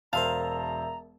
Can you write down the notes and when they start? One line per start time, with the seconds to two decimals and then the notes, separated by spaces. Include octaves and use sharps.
0.13 E1 A#4 C5 E5 F5 A5 A#5